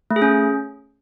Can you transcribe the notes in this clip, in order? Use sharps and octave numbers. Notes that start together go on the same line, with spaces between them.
A3
G#4
C#4